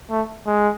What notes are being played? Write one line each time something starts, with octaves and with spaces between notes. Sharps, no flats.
A3
G#3